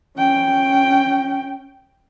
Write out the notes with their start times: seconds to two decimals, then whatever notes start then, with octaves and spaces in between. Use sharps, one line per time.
0.18 C#4 G5